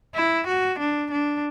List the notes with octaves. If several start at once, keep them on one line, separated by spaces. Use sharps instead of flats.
E4
F#4
D4
D4